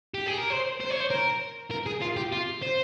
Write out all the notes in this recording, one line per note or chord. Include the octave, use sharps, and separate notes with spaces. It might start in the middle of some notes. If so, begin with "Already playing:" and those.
G4
G#4
A#4
C5
C5
C#5
C5
A#4
A#4
G#4
F4
G4
F4
C5